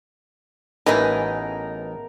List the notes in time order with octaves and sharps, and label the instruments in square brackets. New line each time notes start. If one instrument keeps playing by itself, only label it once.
[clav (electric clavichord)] A1 E3 [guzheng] B3 G#4 B4 [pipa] D#4 [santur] A#4 A5